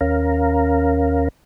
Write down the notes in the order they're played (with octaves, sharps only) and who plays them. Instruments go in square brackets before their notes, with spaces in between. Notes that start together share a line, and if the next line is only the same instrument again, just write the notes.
[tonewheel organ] D#2 C#4 A#4 F5 A#5